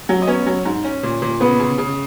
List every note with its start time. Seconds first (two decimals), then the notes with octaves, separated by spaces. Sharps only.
0.09 F#3
0.22 D#5
0.27 B3 C#4 C#5
0.46 F#3
0.65 G#2
0.84 C#4
1.03 A#2
1.22 A#2
1.40 C#3 B3 B4
1.60 C#3
1.78 C#3